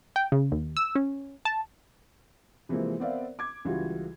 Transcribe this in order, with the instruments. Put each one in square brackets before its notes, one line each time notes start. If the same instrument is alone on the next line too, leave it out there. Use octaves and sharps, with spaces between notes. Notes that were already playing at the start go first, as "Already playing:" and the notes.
[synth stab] G5
C#3
D#2
E6
C#4
A5
[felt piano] C3 E3 F3 G#3 A#3 C4
B3 C4 A#4 D5 E5 F5
D6 G#6
C#2 C#3 E3 G3 F4 F#4